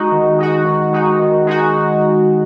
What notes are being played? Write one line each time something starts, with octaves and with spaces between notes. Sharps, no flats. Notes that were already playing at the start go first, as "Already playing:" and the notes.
Already playing: G#3 D#4 F#4
D#3
G#3 D#4 F#4
D#3
G#3 D#4 F#4
D#3
G#3 D#4 F#4